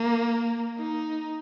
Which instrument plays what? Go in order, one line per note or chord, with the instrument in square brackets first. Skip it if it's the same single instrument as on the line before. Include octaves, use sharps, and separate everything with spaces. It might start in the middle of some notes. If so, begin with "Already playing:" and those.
Already playing: [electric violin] A#3
D#4